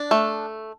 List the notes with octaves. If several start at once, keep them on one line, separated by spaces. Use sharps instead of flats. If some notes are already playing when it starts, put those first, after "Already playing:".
Already playing: D4
A3